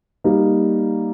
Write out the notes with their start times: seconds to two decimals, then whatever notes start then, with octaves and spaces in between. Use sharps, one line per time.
0.24 G3 A#3 D#4